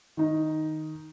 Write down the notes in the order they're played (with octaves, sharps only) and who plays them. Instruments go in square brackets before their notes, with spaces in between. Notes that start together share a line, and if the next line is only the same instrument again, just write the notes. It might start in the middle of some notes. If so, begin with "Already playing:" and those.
[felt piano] D#3 D#4